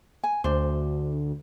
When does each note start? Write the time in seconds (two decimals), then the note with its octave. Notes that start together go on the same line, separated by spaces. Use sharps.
0.24 G#5
0.44 D2 D4 C5